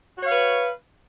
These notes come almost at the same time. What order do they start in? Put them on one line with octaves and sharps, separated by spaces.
F#4 C#5 F5 B4